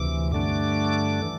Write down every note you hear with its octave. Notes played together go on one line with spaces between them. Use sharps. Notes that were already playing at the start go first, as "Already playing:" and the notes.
Already playing: D2 C3 E3 D6
G2 D3 A3 D4 D6
E3